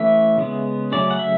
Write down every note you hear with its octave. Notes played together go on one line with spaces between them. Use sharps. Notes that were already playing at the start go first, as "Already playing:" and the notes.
Already playing: E3 A3 C#4 E5
C#3 G#3 B3
C#3 F#3 A3 C#4 D5
F#5
E5